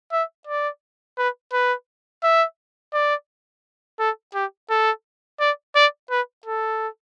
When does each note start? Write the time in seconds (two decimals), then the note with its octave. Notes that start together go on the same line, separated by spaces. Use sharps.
0.12 E5
0.47 D5
1.18 B4
1.53 B4
2.23 E5
2.94 D5
3.99 A4
4.35 G4
4.70 A4
5.40 D5
5.76 D5
6.11 B4
6.46 A4